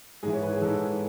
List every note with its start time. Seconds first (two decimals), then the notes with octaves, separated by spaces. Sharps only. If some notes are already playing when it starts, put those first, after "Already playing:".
0.23 G#2 E3 G#4
0.33 C#5
0.42 B4
0.53 G#4
0.62 G#2 E3 A4